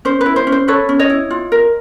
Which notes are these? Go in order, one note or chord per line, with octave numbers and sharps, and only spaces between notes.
C#4 C5
B4
E4
C5
C#4
C5
A4 B4 C#5
C#4
C#5 D#5
E4
F4
A#4